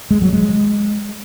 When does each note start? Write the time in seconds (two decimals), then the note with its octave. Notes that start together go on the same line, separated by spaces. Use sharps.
0.11 G#3
0.22 F#3
0.33 G#3